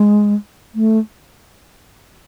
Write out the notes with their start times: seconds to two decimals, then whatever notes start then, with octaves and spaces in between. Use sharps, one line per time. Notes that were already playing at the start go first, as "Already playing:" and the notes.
Already playing: G#3
0.75 A3